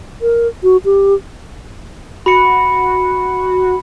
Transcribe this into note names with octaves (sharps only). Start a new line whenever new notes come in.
A#4
F#4
G4
F#4 B5 C#7